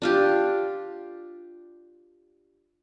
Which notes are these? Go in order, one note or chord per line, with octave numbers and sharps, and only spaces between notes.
D4 F4 G4